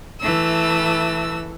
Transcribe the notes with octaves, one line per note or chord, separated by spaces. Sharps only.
E3 A3 E6